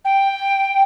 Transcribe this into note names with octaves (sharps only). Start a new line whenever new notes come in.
G5